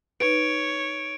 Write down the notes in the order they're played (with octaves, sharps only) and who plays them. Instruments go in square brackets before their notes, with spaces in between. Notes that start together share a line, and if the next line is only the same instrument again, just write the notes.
[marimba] D#4 B4 [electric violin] C#5 [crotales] D7